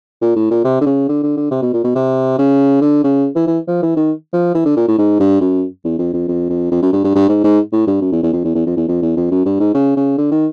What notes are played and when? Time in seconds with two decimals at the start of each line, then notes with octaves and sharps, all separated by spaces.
0.21 A#2
0.36 A2
0.51 A#2
0.65 C3
0.81 D3
0.86 C#3
1.09 D3
1.23 D3
1.37 D3
1.51 C3
1.62 B2
1.73 A#2
1.84 B2
1.95 C3
2.38 C#3
2.81 D3
3.04 C#3
3.36 E3
3.47 E3
3.68 F3
3.83 E3
3.96 D#3
4.33 F3
4.55 E3
4.65 D3
4.77 A#2
4.88 A2
4.98 G#2
5.20 G2
5.41 F#2
5.85 E2
5.99 F2
6.13 F2
6.28 F2
6.50 F2
6.71 F2
6.82 F#2
6.93 G2
7.04 G2
7.15 G2
7.29 G#2
7.44 G#2
7.73 A2
7.87 G2
8.02 F#2
8.12 E2
8.23 E2
8.33 F2
8.45 E2
8.55 E2
8.67 F2
8.77 E2
8.88 F2
9.02 E2
9.17 F2
9.31 F#2
9.46 G2
9.60 G#2
9.74 C#3
9.97 C#3
10.18 D3
10.32 D#3